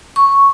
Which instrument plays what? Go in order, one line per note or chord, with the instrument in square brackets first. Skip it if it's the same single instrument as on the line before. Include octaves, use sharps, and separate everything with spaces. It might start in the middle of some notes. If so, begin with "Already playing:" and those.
[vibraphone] C#6